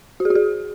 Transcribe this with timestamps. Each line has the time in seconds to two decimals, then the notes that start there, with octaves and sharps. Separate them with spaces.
0.20 F#4
0.25 G#4
0.30 F#4
0.35 G#4